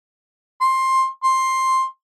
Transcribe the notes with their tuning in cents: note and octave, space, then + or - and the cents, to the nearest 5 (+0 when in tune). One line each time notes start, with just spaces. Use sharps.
C6 +15
C6 +10